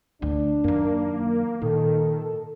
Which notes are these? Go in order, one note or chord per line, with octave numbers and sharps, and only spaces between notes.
D2 D4
F#2 D#3 A#3
A#2 D#3 A4